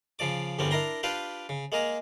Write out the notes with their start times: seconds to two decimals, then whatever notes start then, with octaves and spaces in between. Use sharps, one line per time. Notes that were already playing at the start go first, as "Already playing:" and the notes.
0.19 C#3 F3 D5 D6
0.59 E2 G2 D3 G3 C4 C#4
0.71 D4 E4 A#4 A#5 C6
1.03 D4 F4 G4 B4 F5 G5
1.49 C#3
1.72 G#3 A#3 G#4 A#4